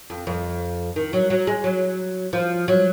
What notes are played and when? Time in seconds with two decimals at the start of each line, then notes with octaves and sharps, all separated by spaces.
0.10 F2
0.27 F2
0.96 D#3
1.13 F#3
1.30 F#3
1.47 G#3
1.64 F#3
2.33 F3
2.68 F#3